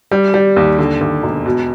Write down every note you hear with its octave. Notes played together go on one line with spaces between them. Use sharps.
G3
G3
D#2
D3
D#2
E1
B2